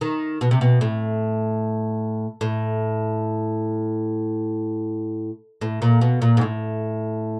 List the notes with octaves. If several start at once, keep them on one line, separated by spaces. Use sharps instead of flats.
D#3
B2
C3
B2
A2
A2
A2
A#2
B2
A#2
G#2
A2